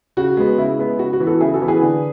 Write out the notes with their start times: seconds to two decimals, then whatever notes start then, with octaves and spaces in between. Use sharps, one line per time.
0.17 C#3 F#4
0.37 G#3 B3
0.58 C#3 E4
0.79 G#3 B3
0.99 C#3 F#4
1.13 F#4
1.20 E3 B3
1.27 F#4 A4
1.41 C#3 E4 G#4
1.54 F#4 A4
1.61 E3 B3
1.68 G#4 B4
1.82 D3